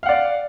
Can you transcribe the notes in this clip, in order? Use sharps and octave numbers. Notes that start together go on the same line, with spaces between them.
D5 F5 F#5